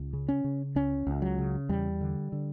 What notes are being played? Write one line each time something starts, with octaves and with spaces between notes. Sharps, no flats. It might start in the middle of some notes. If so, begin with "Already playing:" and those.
Already playing: C#2
C#3
C#4
C#3
C#2 C#4
C#2
F#3
C#3
E2 G3
D3
D3